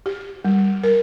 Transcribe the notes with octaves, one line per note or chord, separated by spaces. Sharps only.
G4
G3
A#4